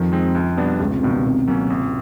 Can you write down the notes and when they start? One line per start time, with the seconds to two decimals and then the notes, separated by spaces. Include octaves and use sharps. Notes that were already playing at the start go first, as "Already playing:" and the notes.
Already playing: F2 D#3 F3
0.12 G#3 C4 D#4
0.35 C#2
0.57 B2 G3 B3 D4
0.80 G1 C#2 C#3
0.91 C3
1.03 G2 B2 D#3
1.14 C3
1.25 C3 D#3
1.48 F#3 A#3 C#4
1.70 G#1